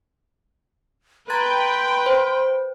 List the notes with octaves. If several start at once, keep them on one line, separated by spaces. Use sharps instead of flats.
B4 G5 A#5 C6 G#6 A6
C5